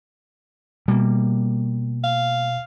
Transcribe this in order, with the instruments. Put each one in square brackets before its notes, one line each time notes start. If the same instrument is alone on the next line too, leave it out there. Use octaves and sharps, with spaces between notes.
[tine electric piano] B2 [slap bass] G3 A#3
[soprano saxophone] F5